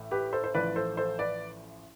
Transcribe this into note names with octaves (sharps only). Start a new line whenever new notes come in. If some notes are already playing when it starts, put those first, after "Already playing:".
Already playing: A1 A2
G4 B4
A4 C5
C5
A1 A2 F3 B4 D5
A4 C5
A4 C5
B4 D5